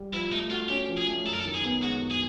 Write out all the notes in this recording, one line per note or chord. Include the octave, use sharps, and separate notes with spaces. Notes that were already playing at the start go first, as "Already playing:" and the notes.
Already playing: G3
F3 E4
A3 D#4
F4 F#4
C#4 G4
F3
G#4
A3
F#2 A4
A#4
A4
D#3
G#4
B3
G#3 F#4
F#2
G#4